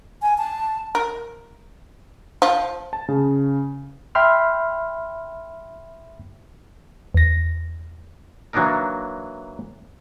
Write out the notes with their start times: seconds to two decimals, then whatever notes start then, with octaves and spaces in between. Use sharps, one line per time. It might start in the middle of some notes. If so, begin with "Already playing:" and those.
0.22 G#5
0.38 A5
0.95 A#4
2.42 F3
2.93 A5
3.08 C#3
4.15 E5 G5 B5 C6 F6
7.14 E2 A#6
8.53 E3 F#3 A#3 D4 D#4 A#4